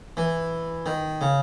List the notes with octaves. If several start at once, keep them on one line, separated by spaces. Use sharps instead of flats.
E3
D#3
C#3